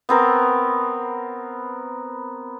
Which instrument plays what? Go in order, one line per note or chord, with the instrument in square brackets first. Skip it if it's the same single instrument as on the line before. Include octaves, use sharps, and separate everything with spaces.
[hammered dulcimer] B3 C4 A#4